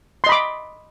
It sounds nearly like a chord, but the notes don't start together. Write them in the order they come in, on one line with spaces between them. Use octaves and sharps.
C6 D#5 B5 D6